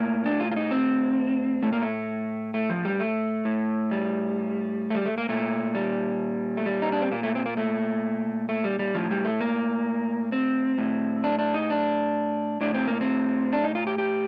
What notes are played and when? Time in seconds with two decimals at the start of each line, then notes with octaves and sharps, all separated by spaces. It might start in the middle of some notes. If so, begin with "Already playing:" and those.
Already playing: A2 A#3
0.25 D4
0.40 F4
0.52 F4
0.56 D#4
0.71 C4
1.63 A2 A3
1.73 A#3
1.82 A3
2.54 A3
2.70 F3
2.85 G3
3.00 A3
3.45 A2
3.91 G3
4.90 A3
4.95 G3
5.06 A3
5.18 A#3
5.29 A#2 A3
5.75 G3
6.57 A3
6.66 G3
6.82 D#4
6.92 D4
7.02 C4
7.12 A#2 A#3
7.23 A3
7.35 C4
7.46 A#3
7.57 A3
8.49 A3
8.64 G3
8.79 G3
8.95 A2 F3
9.11 G3
9.25 A3
9.41 A#3
10.32 C4
10.78 A2
11.24 D4
11.39 D4
11.54 D#4
11.70 D4
12.61 A2 D4
12.74 C4
12.87 A#3
13.01 C4
13.53 D4
13.64 D#4
13.75 F4
13.87 G4
13.98 G4